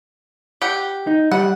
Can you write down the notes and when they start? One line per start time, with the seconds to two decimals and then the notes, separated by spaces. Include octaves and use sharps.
0.62 G4 F#5
1.07 D#4
1.32 G3 F#5